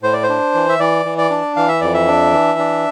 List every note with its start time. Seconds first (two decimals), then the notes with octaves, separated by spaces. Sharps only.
0.03 A2 C5
0.13 D5
0.23 C5
0.29 D4
0.55 E3
0.69 E5
0.80 E3 D5
1.05 E3
1.18 D5
1.31 D4
1.56 E3 F5
1.68 E5
1.81 F2 D5
1.94 E5
2.07 D4
2.33 E3
2.59 D4